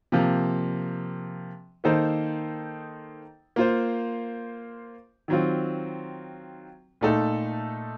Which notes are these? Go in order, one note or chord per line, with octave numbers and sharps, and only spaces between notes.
C3 F3 A#3
D#3 A#3 D#4 A4 C5
A#3 F4 C5
D#3 F#3 C4 F4
A#2 A3 D#4 A4